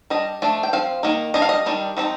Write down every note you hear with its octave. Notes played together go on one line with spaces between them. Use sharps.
G3 D4 D#5
F3 A3 D4
G5
F3 C4 F5
D#3 A#3 D#4
G3 D4 D#5
F5
D#5
D#3 G3 D4
F3 C4 D#4